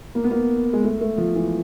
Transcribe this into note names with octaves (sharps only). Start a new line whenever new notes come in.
A#3
B3
A#3
G#3
A3
A3
F3
E3